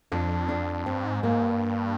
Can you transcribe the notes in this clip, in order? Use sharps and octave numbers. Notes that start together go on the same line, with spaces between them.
F2 D4
D4
G2 C4
G#2
G#2 A#3
G2